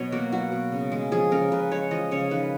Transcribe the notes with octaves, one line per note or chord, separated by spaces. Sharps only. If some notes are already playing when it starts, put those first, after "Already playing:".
Already playing: B2 F#3 C#5 D#5
A#3 F#4
F#3 F#4
B2
C#3
G#3
F3 G#4
C#3 A#4
C#3 B4
G#3 C#5
F3 D#5
C#3 C#5
D#3 B4